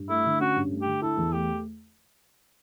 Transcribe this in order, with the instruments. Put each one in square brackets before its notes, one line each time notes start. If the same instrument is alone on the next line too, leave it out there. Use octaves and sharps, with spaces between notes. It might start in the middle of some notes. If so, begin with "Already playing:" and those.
Already playing: [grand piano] G2
[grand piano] A3 [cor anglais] E4
[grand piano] D3
[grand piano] C#4 [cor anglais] F#4
[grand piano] G2
A3
[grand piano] D3 [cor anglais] G4
[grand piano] E4 [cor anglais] A4
[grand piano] E2
[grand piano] A3 [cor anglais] G4